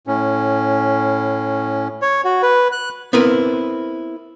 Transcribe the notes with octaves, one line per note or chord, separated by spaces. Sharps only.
A2 C#4
C#5
F#4
B4
F#6
B3 C4 E4 A#4 B4